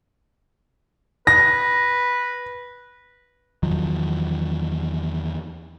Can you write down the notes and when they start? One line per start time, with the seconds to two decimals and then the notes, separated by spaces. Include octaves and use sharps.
1.27 B4 A#6
3.63 E2 D#3 F3 F#3